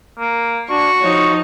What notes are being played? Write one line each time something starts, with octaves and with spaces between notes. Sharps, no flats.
A#3
D4 F#4 C#6
F3 D#4 C#5